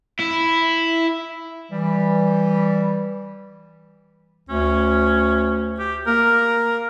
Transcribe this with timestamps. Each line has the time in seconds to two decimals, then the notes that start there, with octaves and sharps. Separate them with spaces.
0.20 E4
1.72 E3 G3
4.49 D2 C#4
5.79 G4
6.07 A#3 A#4